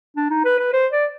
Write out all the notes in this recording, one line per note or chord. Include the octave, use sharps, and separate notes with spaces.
D4
D#4
B4
B4
C5
D5